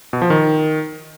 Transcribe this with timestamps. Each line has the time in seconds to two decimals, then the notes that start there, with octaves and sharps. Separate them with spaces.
0.13 B2
0.22 F3
0.30 D#3